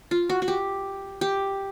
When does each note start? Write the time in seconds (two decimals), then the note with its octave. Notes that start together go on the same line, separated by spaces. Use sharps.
0.11 F4
0.29 F#4
0.42 F#4
0.48 G4
1.21 G4